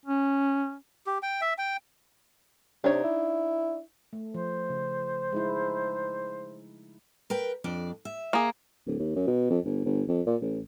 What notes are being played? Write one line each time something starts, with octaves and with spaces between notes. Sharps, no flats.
C#4
G4
G5
E5
G5
C3 D4 D#4 C#5
E4
A3
F3 C5
C#3
G#3 D#4 E4
A#4 B4 G5
F2 D4 D5
E5
A#3 G#4
D1
D#2
F#2
B2
F2
G1
G1
F2
A#2
A1